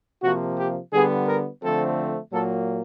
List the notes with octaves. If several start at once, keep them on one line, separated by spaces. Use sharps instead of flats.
C3 F3 A#3 F#4
G4
D3 G3 B3 G#4
A#4
D3 F3 A3 C4 A4
A#2 F#3 A#3 A4